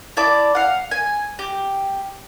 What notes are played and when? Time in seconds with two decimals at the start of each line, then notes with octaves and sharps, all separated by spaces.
0.17 E4 D5 A5 D6
0.55 F5 F#5
0.91 G#5
1.39 G4